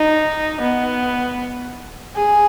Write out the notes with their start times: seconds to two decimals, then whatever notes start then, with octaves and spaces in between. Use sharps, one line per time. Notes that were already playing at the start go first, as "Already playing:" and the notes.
Already playing: D#4
0.61 B3
2.16 G#4